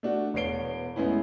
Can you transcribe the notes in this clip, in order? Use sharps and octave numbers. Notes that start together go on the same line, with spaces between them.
A3 D4 F#4
E1 B3 C#5 C7 D7 G7
G#3 A3 B3 C#4 E4